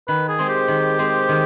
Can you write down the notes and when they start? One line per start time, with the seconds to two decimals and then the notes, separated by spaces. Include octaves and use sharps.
0.08 D#3 B4
0.29 G#4
0.39 G#3 C4
0.49 G4
0.68 D#3
0.99 G#3 C4
1.29 D#3